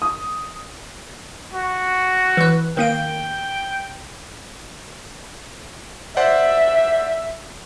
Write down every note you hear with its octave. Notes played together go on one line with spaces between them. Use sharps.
D#6
F#4
E3 B4
D#3 A#3 G5 D7
C5 D5 E5 F#5